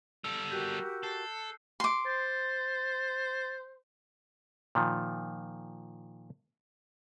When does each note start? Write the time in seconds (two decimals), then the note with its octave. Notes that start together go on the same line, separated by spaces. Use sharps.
0.24 G3 A4 E6
0.52 F#4 G4 A#4 E6 F#6 G6
1.03 A4 C7
1.80 C6 D6
2.06 C5 A6
4.75 A#2 D#3 F3